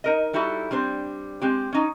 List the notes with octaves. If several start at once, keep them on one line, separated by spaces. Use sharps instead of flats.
D#4 A#4 D#5
G3 D#4 E4 F#4 A4
G3 C4 D4 C5
G#3 C4 G4
C#4 D#4